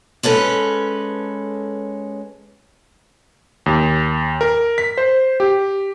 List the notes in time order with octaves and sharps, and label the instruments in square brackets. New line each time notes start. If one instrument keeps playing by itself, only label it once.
[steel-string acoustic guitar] G#3 C#4 A4 B4
[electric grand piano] D#2
A#4
B6
C5
G4